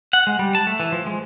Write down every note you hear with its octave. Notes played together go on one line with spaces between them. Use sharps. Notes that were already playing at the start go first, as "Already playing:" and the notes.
F#5
G#3
G3
A5
A3
E3
F3
G#3